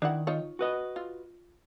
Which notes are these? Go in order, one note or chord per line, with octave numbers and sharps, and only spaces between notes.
D#3 D4 E4 F#5
D#4 F4 C#5
F#4 B4 D#5
F4